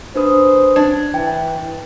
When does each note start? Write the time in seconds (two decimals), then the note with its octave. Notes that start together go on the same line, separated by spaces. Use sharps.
0.15 D4 B4 C5 D#6
0.76 D4 G#6
1.14 E3 G5